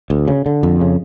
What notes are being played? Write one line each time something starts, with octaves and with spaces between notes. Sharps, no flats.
D2
C#3
D3
F2
C#3